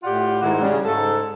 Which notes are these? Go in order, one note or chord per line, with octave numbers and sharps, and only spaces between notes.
A2 F4 G4 D5 F#5
G#2 D#3 G#3 E4 F#4
C#3 G3
G#2 A4